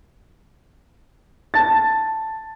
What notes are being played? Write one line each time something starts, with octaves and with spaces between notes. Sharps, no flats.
A5 A6